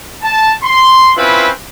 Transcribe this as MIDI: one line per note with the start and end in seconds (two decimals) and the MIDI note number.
0.23 0.52 81
0.64 1.12 84
1.17 1.49 60
1.17 1.49 61
1.17 1.49 64
1.17 1.49 65
1.17 1.49 71